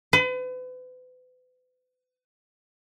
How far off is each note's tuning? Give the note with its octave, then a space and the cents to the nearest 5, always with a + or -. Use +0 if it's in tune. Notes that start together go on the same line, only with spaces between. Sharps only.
B4 +40